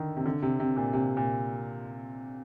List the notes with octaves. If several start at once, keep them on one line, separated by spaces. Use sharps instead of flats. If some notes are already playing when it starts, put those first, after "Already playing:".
Already playing: D3 D#3
C3
D3
C3
C3
A#2
C3
A#2